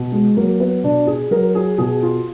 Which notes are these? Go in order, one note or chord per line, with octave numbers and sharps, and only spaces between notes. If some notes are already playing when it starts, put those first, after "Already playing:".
Already playing: B2
G#3
F#3 A#3
B3
B2 D4
G#4
F#3 A#4
G#4
B2 G#4
F4